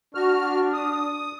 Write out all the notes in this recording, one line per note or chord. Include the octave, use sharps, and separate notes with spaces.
D4 F#4 F6
D#6